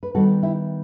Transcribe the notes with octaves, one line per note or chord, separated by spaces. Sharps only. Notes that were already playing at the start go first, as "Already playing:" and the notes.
B4
D#3 G3 B3 F#4 A4
E4 G4